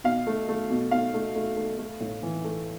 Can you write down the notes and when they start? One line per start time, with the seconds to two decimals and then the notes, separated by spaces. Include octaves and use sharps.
0.04 B2 F5
0.27 A3
0.49 A3
0.70 B2
0.91 B2 F5
1.14 A3
1.35 A3
1.56 A3
1.79 A3
2.01 A2
2.23 E3
2.44 A3